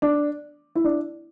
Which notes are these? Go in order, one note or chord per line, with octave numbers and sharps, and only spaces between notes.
D4
E4
D4